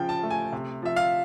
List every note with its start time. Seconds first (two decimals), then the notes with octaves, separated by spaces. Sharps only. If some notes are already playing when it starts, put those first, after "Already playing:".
Already playing: C#3 F3 G5
0.09 A5
0.23 A3
0.31 G#5
0.52 C3
0.82 F3 E5
0.96 F5